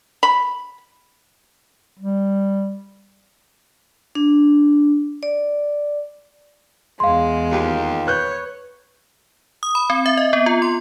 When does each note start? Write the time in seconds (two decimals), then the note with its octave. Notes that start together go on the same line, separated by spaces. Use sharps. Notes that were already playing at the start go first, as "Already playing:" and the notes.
0.23 B5
1.99 G3
4.15 D4
5.23 D5
7.00 E2 G#3 F5 C6
7.52 D#2 F4 G4
8.07 B4 C#5 F#6 G6
9.63 D#6
9.75 B5
9.90 C4
10.06 E5
10.17 D#5
10.33 B3
10.46 F4
10.62 C6